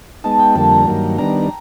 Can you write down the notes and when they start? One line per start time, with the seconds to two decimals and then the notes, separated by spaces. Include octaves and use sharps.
0.24 G#3 B3 D#4 A5
0.39 G5
0.55 F2 D3 G3 A#3 A5
0.71 A#5
0.87 G2 D#3 F#3 A#3
1.18 D#3 G3 B3 D4 A#5